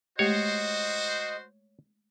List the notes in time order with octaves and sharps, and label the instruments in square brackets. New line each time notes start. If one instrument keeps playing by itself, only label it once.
[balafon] G#3 A3 G4 [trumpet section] F#4 C5 [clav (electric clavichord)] C#5 [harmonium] D#5